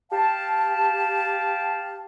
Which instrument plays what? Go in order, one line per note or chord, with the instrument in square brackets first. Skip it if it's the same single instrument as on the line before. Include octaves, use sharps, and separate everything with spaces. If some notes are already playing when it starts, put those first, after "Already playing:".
[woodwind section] G4 F5 A5